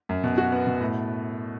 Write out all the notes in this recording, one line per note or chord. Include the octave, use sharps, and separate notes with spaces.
F#2
B2
F#4
B3
B2
A2